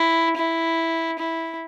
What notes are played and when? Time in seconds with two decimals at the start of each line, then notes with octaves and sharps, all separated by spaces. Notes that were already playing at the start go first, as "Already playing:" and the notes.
Already playing: E4
0.37 E4
1.19 E4